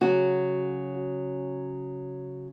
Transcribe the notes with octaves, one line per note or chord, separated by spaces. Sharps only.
C#3 F#3 F#4